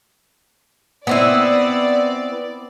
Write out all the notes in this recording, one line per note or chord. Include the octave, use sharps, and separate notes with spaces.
B3 C4 E4 D5